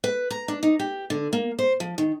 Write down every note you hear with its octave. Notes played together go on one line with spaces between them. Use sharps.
B4
A#5
D4
D#4
G4
D3
A#3
C5
F3
D#3